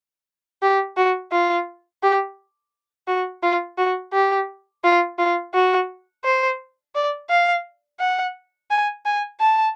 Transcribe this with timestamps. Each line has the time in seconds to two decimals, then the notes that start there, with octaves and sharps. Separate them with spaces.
0.62 G4
0.97 F#4
1.32 F4
2.03 G4
3.08 F#4
3.43 F4
3.78 F#4
4.13 G4
4.84 F4
5.18 F4
5.54 F#4
6.24 C5
6.95 D5
7.29 F5
8.00 F#5
8.70 G#5
9.05 G#5
9.40 A5